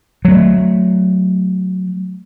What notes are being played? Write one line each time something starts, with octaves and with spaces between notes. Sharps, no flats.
F#3 A3